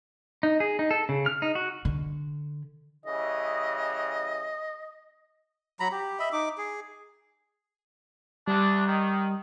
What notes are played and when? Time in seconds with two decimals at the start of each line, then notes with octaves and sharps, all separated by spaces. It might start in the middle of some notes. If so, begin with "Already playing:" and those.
0.43 D#4
0.60 G#4
0.79 D#4
0.91 A4
1.09 C#3
1.26 F6
1.42 D#4
1.55 F#4
1.85 D3
3.06 C#3 E3 G3 D#5
5.80 F#3 A#5 B5
5.92 G4
6.19 D#5 E5 B5
6.33 D#4 D6
6.58 G#4
8.48 D2 G3 D4
8.88 D#3